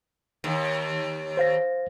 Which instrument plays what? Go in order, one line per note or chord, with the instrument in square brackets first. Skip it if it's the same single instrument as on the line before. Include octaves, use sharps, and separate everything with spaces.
[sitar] D#2
[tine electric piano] C5 F5 A#6